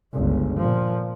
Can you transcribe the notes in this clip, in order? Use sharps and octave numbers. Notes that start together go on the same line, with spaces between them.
G1 C#2
A#2 F3